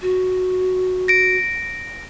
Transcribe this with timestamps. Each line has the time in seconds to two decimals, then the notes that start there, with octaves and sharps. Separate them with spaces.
0.02 F#4
1.08 A#6 D7